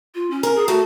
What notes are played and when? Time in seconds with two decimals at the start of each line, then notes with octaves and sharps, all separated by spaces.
0.15 F4
0.31 C#4
0.43 A#4
0.56 G#4
0.68 A3 F#4